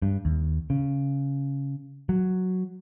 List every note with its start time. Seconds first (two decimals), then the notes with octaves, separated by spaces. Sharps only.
0.02 G2
0.25 D#2
0.70 C#3
2.09 F#3